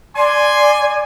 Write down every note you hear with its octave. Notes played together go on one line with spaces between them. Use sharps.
D5 G#5 C6